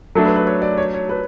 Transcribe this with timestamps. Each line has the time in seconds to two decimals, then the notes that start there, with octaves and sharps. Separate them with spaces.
0.15 F#3 A3 D4 A4
0.25 B4
0.36 B4
0.47 C#5
0.62 D5
0.77 C#5
0.94 C#5
1.09 B4